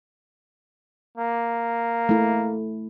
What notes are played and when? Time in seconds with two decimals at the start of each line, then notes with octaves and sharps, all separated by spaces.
1.18 A#3
2.09 A3 E4